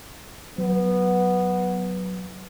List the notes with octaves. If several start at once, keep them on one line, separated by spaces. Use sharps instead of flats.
F#3 B3